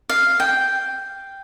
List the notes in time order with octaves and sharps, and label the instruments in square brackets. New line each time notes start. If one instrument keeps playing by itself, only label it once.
[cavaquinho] F5
G5